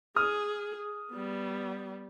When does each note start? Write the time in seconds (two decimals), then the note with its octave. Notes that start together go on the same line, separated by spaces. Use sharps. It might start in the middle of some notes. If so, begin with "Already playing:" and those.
0.16 G#4 D#6 F6
1.12 G3 B3